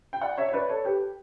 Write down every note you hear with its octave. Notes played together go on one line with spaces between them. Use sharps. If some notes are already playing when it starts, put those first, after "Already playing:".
G5
D5 F#5
C#5 E5
C#5
B4 D5
A4 C#5
G4 B4